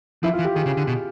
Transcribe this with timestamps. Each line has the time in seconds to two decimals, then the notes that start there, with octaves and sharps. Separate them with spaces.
0.23 F3 E4
0.33 F4
0.39 E3
0.45 G4
0.55 D#3 G#4
0.66 C#3
0.77 D3
0.87 B2